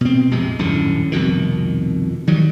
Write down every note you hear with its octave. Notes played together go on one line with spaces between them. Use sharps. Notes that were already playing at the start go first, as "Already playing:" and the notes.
B2 C4
A#1 F2 C3 G#3
D#1 F#2 A2 D3
C2 F2 B2 D#3
D#3 F#3 G3